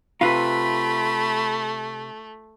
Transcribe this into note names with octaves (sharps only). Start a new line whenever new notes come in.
C3 A3 F4 B4 B5